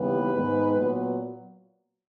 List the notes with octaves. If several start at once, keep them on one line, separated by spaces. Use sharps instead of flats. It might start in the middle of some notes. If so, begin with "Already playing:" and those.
Already playing: D#2 C#3 E3 G3 B3 B4
G#2 D#3 G#3 B3
A#2 F#3 B3